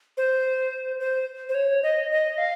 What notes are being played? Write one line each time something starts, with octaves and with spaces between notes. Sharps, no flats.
C5
C5
C5
C#5
D#5
D#5
F5